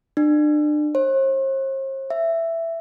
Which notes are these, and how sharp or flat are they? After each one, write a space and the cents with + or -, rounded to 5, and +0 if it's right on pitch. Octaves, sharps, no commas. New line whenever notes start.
D4 +30
C5 +45
E5 +10